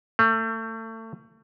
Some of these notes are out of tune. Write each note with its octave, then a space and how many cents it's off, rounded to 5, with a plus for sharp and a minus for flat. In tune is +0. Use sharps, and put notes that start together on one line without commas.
A3 +30